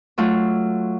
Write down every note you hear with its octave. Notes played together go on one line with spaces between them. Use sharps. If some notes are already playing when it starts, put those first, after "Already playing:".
F#3 A3 F4